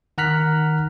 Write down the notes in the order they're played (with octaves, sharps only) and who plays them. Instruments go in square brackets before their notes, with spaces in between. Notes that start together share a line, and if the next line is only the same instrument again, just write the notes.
[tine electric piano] D#3 F#5 A#5 F6 F#6 B6